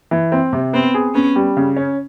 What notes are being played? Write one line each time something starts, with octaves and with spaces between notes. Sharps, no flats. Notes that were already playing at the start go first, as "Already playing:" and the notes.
E3
C4
C3
B3 C4
G#4
B3 C#4
G3
C#3
C#4